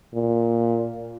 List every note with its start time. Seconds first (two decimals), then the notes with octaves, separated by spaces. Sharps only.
0.14 A#2